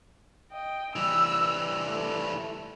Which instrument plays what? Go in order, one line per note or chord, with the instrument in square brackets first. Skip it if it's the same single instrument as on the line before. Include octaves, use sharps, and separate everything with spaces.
[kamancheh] D#5 G5
[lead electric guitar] E3 G3 [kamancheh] E6
[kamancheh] A3